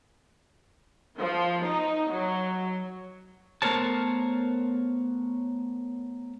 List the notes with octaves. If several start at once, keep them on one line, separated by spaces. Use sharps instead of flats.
F3
D#4
F#3
A3 B3 A#4 C5 C#5 A5